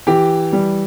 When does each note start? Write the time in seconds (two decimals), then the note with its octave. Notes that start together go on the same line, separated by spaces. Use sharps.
0.07 E3 G4
0.53 G3